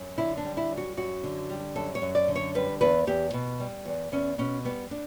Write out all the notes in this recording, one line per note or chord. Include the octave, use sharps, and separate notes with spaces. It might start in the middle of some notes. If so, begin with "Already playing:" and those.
Already playing: F#2
D3 E4
D4
G3
E4
F#2
F#4
F#2 F#4
D3
G3
F#2 A4
C#5
F#2
D5
D3
C#5
G3 B4
E2 B4
E2 G4
B2
G3
E2
E2 C#4
B2 C#4
G3 B3
D4